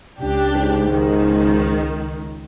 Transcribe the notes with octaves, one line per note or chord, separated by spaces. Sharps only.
C#2 D4 G4
G#2
C#2 D#3